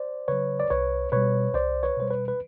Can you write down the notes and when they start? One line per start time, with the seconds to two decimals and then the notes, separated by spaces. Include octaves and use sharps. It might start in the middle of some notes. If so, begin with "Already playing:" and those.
Already playing: C5 D5
0.28 C#3 F#3 B4 C#5
0.60 D5
0.70 C2 B4 C#5
1.12 B2 G3 B4 C#5
1.54 C2 C5 D5
1.83 B4 C#5
1.97 B2 G3 C5
2.10 B4
2.28 B4